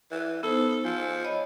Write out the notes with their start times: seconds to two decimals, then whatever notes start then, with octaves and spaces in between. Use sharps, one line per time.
0.11 E3
0.43 B3 D#4 A4 C5
0.84 F3 G#5
1.25 C#5 D#5 B5